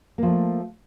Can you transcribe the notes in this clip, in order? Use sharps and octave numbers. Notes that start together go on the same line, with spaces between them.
F3 A3 A#3